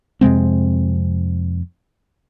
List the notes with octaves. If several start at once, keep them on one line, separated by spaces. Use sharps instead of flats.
F2 C3 G#3 C4